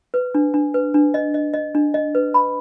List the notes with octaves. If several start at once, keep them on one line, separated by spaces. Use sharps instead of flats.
B4
D4
D4
B4
D4
D#5
D#5
D#5
D4
D#5
B4
B5